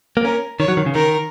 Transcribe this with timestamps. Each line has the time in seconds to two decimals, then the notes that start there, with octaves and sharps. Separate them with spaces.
0.17 A#3
0.25 C#4 A#4
0.60 D#3 C#5
0.68 F#3
0.77 D#3
0.86 C#3
0.94 D#3 A#4